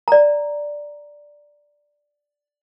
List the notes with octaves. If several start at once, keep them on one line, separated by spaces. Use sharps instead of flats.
D5 A#5